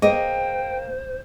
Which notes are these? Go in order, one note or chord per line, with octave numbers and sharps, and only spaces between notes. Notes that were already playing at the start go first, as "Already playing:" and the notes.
A#3 G#4 C5 D#5 G5